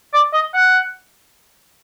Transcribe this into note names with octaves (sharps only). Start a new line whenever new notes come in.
D5
D#5
F#5